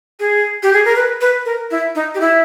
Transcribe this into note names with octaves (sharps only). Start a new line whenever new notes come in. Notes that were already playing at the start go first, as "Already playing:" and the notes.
G#4
G4
G#4
A#4
B4
B4
A#4
E4
D#4
G4
E4